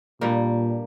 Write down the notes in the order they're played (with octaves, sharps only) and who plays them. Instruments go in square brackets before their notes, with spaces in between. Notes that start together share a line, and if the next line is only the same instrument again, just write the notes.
[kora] G2 G3 A#3 [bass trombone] A#2